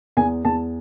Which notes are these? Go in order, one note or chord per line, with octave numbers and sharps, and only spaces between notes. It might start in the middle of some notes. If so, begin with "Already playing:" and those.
E2 G#5
E2 A5